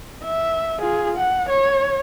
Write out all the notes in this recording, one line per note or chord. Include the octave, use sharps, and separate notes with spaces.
E5
F4 G#4
F#5
C#5